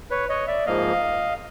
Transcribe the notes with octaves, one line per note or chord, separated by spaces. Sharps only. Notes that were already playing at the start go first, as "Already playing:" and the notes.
B4 C#5
C#5 D#5
D5 E5
G#2 F3 A#3 D#5 F5